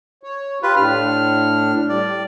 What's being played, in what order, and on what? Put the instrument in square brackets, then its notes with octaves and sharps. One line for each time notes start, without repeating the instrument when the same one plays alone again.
[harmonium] C#5
[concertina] F4 B4 [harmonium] G4
[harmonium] A2 D4 [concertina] F6
[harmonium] G3 [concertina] D5